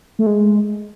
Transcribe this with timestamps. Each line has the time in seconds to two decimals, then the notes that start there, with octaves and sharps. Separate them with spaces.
0.19 A3
0.26 G#3